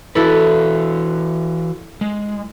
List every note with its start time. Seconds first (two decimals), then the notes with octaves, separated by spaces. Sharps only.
0.15 E3 E4 F#4 A4 B4
2.01 G#3